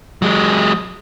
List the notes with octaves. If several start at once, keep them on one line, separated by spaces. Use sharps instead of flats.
F#3 G#3